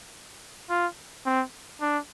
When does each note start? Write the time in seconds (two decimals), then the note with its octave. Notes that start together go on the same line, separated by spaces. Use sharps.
0.70 F4
1.26 C4
1.81 D4